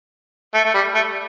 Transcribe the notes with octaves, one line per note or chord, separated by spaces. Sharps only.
A3
A3
G3
A3